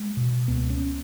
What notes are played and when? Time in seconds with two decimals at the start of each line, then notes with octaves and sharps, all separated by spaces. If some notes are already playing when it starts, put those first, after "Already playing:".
Already playing: G#3
0.17 B2
0.48 C#2 B3
0.70 C#4